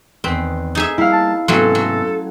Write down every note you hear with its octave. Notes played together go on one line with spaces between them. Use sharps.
E2 D#3 C4 B4 C5
D#4 G#4 E5
G3 A#3 E4 F5
A5
G#2 C3 F#3 A3 B3 C#4 A4 C6
F#3